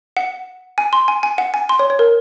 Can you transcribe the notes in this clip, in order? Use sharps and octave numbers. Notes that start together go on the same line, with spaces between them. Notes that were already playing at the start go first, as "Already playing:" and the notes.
F#5
G#5
C6
G#5
G#5
F#5
G#5
C6
C#5
C#5
A#4